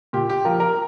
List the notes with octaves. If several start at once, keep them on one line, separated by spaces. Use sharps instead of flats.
A#2 G4
G4
F3 A#4
A#4